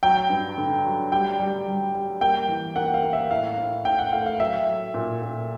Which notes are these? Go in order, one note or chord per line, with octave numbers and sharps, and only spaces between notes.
F#3 G5
G2
D3
F#3
G3 G5
G3
G3
G3
A#3 G5
E3
A#3 F#5
F5
A#3
E5
A2 F5
A2
A2 G5
F#5
A3 F5
F5
F#3 E5
F#3
A#2
A#2